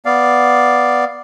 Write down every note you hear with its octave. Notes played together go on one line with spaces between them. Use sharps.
B3 D5 F5